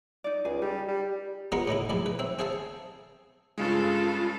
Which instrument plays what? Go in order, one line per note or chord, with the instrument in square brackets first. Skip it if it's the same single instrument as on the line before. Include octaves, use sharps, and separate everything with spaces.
[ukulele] D#4 D5
[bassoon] C#2 [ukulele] G#4 G#5
[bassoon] G3 [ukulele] D#4
[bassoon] G3
[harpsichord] G#3 B3 F4 A#4 B5 C#6
A2 C#3 D#4 E4
A#1 G#2 E4 D5
B4
C4 E5
C4 G#4 E5 F5 A5
[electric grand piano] G2 C#3 G#3 [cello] F4 A4